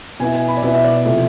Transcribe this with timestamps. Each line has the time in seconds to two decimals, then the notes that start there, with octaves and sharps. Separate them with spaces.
0.20 B2 B3 E4 G#5
0.34 G#5
0.48 B5
0.57 D5
0.63 B2 B3 E4 E5
0.74 E5
0.84 D5
1.05 C3 F3 A3 E4